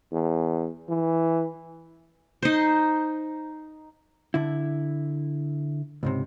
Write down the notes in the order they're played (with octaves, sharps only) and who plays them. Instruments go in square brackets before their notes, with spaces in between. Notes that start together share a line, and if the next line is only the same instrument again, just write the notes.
[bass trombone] E2
E3
[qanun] D#4 C5
[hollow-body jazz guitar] D3 E4
C#2 G#2 C3